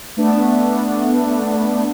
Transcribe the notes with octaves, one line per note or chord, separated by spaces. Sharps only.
A3 B3 D4